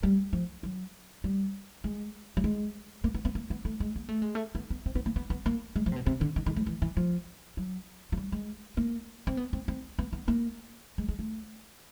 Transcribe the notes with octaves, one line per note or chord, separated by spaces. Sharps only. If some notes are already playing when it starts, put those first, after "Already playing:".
G3
F3
F#3
G3
G#3
G3
G#3
A#3
B3
B3
A#3
B3
A3
G#3
A#3
A3
G#3
A3
B3
B3
C4
B3
A#3
B3
B3
A#3
G#3
F3
C3
B2
C3
D3
D#3
D#3
A3
D#3
E3
E3
F3
F#3
F#3
G3
G#3
A#3
C4
B3
C4
C4
B3
B3
A#3
G#3
G#3
A3